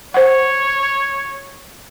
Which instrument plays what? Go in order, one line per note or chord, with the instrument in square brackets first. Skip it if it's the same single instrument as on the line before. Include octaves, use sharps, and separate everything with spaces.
[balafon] C5 F#5 [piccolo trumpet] C#5